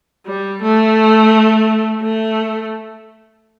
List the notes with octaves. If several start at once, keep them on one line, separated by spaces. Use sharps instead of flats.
G3
A3
A3